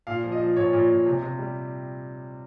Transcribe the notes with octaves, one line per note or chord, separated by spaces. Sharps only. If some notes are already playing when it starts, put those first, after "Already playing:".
A#2 F5
F3
D#5
F3
A#2 C#5
A#2
A#2
C3
C3
G3